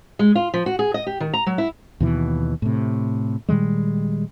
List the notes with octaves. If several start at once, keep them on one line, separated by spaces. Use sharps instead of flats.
G#3
F4
F3
F#4
G#4
D#5
G4
D#3
A#5
F#3
E4
D#2 B2 E3
A2 C3
A#2 D#3 G3 G#3